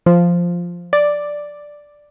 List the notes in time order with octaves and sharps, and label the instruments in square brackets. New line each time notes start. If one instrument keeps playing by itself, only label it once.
[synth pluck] F3
D5